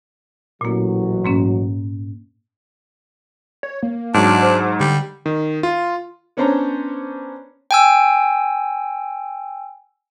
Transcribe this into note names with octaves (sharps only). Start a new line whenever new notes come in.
A1 A#2 F#3 A#3
G#2 A#3 C#4
C#5
A#3
G#2 F#3 D4
C5
D3 G3
D#3
F4
B3 C#4 D4 C5 C#5 A#5
G5 G#5 E6